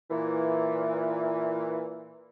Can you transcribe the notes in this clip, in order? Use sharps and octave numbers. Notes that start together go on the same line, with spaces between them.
A#2 E3